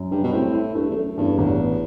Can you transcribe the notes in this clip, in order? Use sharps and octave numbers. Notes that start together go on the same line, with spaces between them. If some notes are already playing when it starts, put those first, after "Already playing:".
Already playing: F#2
G2 G3
B2
A2 C4
E4
G2 A3
E2
F#2 A3
E2 G2
A1 E2
B3